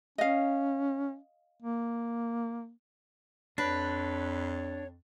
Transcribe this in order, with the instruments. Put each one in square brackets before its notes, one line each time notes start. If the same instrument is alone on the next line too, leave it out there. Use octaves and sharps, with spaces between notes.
[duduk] C#4 [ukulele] D#5 F5
[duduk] A#3
[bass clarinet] F2 [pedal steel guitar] D4 [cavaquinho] B4 [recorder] C#5